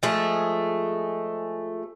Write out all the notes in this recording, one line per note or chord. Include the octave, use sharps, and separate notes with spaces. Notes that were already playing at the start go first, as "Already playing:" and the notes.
F3 G#3 A3 G#4